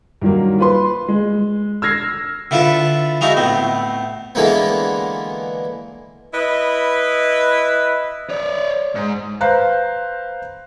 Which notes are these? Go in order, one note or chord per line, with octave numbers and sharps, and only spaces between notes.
G2 D#3 F#3 A#3
F4 B4 C6
G#3
E6 F6 G#6 A#6 C7
D3 E4 F4 A4 B4 A5
D#4 E4 F#4 G#4 F5
A2 B3 C4
D3 E3 G#3 A#3 B3
E4 B4 D#5
C#5 D5
G#2
B4 C5 F5 A#5 F#6